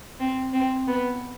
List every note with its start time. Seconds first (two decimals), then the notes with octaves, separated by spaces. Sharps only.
0.20 C4
0.53 C4
0.87 B3